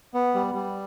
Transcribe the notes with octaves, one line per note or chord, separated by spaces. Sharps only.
B3
G3
G3